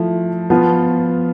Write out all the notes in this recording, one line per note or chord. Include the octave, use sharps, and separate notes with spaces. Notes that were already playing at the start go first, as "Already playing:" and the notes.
Already playing: F3 A3 E4
F3 B3 F4